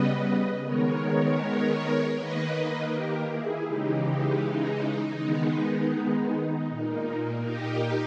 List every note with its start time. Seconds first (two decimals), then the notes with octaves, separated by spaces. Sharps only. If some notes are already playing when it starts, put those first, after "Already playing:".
Already playing: C#3 G3 B3 B4 D#5
0.64 D#3 G#3 B3 A#4 C#5
2.15 D#3 A#3 B4 D#5
2.91 G4 A#4
3.29 E4 G#4
3.66 C#3 E3 G#3 D#4 G4
4.42 D#4
5.18 D#3 G#3 B3
6.69 A#2 A#3
7.44 D#4 G4